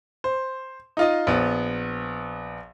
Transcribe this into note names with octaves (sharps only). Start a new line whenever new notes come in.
C5
D#4 F4 D#5
A#1 B3